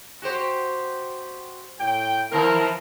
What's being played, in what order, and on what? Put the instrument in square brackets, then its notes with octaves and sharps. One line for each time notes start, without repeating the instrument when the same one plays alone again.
[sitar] F#4 G4 C5
[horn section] A2 G5
[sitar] D#3 F3 B3 [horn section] E4 A#4